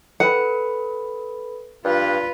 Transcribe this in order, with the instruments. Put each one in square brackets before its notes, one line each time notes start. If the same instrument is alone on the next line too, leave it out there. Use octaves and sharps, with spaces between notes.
[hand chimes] A4 B4 B5 [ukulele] F#5
[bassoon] G2 [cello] F4 B4